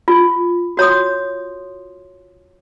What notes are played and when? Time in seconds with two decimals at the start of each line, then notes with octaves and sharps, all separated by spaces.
0.08 F4
0.77 F#4 C#5 C6 D#6